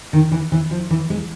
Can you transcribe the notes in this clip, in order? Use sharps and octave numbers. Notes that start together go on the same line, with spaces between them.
D#3
E3
E3
F3
E3
G#3